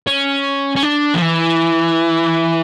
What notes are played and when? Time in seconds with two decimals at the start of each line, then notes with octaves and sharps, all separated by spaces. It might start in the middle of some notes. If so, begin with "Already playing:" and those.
0.07 C#4
0.76 C#4
0.83 D4
1.15 F3
1.21 E3